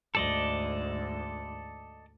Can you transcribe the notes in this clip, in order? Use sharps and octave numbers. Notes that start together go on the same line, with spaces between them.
D2 G#2 A4 D5 D#5